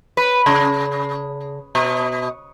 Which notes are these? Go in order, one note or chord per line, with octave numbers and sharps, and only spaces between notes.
B4
C#3
B2